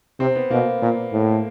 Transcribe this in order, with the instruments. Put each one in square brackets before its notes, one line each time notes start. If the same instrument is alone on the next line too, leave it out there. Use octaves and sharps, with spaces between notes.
[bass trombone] C3 [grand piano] C4
[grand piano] B3
[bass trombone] B2 [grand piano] A#3
[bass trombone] A#2
A2